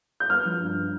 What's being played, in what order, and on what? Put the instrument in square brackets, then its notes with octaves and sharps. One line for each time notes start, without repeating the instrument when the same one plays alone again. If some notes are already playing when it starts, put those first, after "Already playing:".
[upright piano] G6
B3 F6
F3
G2